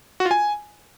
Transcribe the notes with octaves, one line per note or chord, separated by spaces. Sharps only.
F#4
F4
G#5